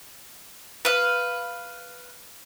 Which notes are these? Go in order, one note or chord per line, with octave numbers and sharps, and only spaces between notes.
B4 F5